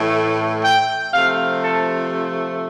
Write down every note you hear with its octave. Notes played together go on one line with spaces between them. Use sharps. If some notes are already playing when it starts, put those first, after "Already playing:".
Already playing: A2 E3 A3
G5
C3 F3 A3 F5
A4